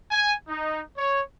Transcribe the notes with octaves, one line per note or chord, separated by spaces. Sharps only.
G#5
D#4
C#5